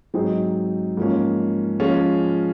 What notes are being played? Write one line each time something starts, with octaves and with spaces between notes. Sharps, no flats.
G#2 F#3 C4 D#4 G#4
G#2 F3 A#3 C#4
F3 G#3 C#4 F4